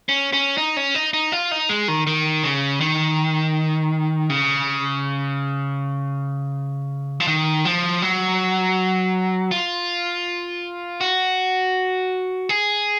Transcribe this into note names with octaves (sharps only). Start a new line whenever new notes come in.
C#4
C#4
D#4
C#4
D#4
D#4
F4
D#4
G#3
D#3
D#3
C#3
D#3
C#3
F3
D#3
F3
F#3
F4
F#4
G#4